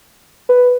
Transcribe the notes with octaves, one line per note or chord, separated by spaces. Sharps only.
B4